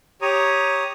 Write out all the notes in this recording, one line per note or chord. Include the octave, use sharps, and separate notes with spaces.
G4 C#5 A#5 D#6